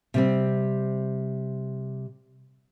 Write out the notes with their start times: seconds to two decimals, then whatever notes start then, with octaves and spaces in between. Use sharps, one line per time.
0.14 C3 G3 C4